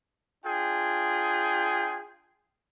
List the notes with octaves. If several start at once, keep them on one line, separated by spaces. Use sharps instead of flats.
D4 F4 G#4 G5